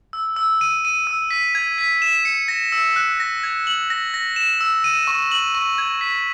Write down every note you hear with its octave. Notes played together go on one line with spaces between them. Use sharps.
E6
E6
D#7
D#7
E6
B6
G#6
B6
E7
C#7
A#6
E6
F#6
A#6
G#6
F#7
A#6
A#6
E7
E6
D#7
C#6
F#7
C#6
G#6
B6